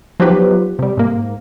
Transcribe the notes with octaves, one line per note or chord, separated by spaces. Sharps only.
F3 F#3 B3 D#4 G4 B4
C3 G3
G#2 A#3